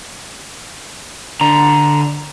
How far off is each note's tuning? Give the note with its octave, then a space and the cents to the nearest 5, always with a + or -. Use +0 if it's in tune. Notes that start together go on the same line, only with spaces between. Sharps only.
D3 +0 A#5 +5